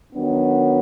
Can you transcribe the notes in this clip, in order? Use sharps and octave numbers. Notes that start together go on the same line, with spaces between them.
D#3 F#3 B3 D4